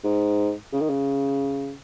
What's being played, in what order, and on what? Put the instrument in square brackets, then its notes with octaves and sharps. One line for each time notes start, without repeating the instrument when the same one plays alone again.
[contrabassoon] G#2
C#3
D#3
C#3